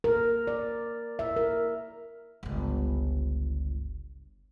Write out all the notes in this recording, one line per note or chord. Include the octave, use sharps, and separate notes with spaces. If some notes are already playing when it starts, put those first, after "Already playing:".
A#4
D5
E5
A#4
G1 C#2